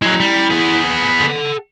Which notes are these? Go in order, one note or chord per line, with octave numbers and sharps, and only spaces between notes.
F#3 G#3 E4 A#5
G3
B3 G#4
A4 F#5